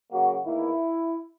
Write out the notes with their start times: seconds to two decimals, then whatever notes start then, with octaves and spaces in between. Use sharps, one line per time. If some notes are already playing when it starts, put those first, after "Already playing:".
0.10 C#3 F#3 A#3 F#4
0.44 E2 D#3 A#3 E4